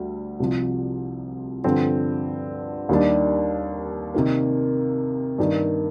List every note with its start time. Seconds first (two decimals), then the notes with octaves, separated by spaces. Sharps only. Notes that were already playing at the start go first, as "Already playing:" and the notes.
Already playing: D2 G3
0.40 C2 C3 F3
1.64 G2 D3 F3 C4
2.89 D#2 D#3 G3 D4
4.14 C3 D#3 A#3
5.39 G2 D#3 A#3